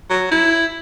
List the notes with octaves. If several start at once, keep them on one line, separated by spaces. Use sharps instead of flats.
F#3
E4